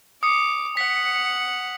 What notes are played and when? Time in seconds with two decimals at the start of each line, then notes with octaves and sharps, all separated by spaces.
0.23 D6 D#6 C#7
0.77 F#5 B6